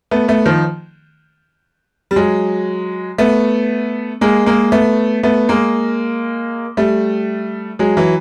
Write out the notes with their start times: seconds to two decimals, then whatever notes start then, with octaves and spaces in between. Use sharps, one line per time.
0.11 A3 B3
0.28 A3 B3
0.46 D#3 F3
2.11 G3
2.16 F#3 G#3
3.18 A3 B3
4.21 G#3 A#3
4.46 G#3 A#3
4.72 A3 B3
5.23 A3 B3
5.49 G#3 A#3
6.77 G3 A3
7.79 F#3 G#3
7.97 E3 F#3